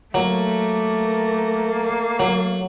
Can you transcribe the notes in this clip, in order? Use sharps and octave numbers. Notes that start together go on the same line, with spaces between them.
F#3 A3 A#3
F#3